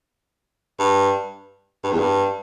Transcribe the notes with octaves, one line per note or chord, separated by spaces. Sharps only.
G2
G2
E2
G2